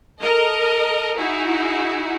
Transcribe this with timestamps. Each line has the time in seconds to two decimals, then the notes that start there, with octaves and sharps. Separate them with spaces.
0.20 A4 A#4 D#5
1.17 D#4 E4 F#4 G#4